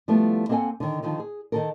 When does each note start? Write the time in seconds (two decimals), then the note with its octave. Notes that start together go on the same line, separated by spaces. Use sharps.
0.08 F3 G3 A3 B3 E4
0.49 A#3 C4 A4 E5 F#5 G#5
0.80 D3 D#3
1.02 D3 D#3 F3 D#4 F4
1.19 G#4
1.52 D#3 A4 A#4